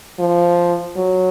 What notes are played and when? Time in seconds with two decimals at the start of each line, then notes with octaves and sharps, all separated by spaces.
0.19 F3
0.96 F#3